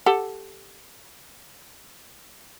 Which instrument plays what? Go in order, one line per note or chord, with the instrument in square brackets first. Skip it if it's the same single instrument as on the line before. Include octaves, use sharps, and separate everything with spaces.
[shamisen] G4 A4 F#5